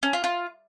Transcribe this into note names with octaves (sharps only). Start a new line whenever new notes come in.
C#4
F4
F4